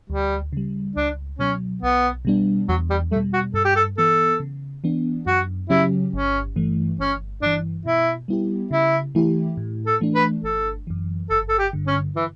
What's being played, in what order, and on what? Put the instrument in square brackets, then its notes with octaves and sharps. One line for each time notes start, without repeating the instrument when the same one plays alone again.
[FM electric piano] D2 [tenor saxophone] G3
[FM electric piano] C#3 G3
[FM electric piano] C#2 [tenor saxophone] D4
[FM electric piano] B2 F#3 [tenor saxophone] C#4
[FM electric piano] B1 [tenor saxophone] B3
[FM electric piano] B2 G3 B3 D4
[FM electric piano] E2 [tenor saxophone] F#3
[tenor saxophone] G3
[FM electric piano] G3 [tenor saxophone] A3
[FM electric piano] B2
[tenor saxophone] F#4
[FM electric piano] G2 [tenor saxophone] A4
[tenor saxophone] G4
A4
[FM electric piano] E3 B3 [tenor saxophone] A4
[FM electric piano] C#3
E3 B3 D4
[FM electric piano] F#2 [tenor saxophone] F#4
[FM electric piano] C#3 F#3 C#4 G4 [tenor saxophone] E4
[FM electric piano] G1 [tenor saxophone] C#4
[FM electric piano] G2 E3 A3
[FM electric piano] G1 [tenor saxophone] C#4
[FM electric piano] G2 E3 [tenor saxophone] D4
[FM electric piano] B2 [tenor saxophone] E4
[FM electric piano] G3 B3 E4 G4
[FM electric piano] C#3 [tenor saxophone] E4
[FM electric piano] E3 A3 E4 G4
A2
[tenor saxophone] A4
[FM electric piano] E3 A3 D4
[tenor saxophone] B4
[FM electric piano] G1 [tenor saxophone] A4
[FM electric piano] F#2 E3
[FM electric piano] G1 [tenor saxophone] A4
[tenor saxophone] A4
G4
[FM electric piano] G2 D3
[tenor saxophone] C#4
E3